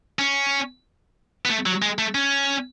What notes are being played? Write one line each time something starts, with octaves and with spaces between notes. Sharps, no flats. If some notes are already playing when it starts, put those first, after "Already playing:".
C#4
B3
A3
F#3
G#3
A3
C#4